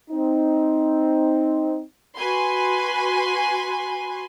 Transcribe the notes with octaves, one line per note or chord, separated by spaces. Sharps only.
C4 D#4
F#4 B4 G#5 C6